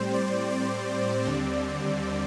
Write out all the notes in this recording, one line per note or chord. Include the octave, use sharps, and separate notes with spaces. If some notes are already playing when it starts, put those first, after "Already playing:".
Already playing: A2 G3 C4 C5
D5
D5
D#2 D3 G3 C4